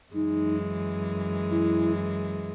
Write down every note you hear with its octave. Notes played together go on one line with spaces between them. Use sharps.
F#2 E3 G#3 D#4
E4